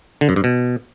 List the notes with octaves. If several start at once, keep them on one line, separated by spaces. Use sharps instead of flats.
D3
F#2
G2
B2